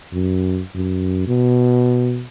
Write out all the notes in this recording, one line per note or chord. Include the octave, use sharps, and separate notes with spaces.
F#2
F#2
B2